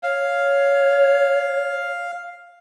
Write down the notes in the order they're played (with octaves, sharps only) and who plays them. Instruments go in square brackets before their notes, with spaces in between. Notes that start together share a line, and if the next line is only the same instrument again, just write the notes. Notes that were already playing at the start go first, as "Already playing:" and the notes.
[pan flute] C#5 [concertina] F5